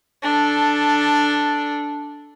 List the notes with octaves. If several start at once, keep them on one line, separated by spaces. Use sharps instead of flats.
D4 A4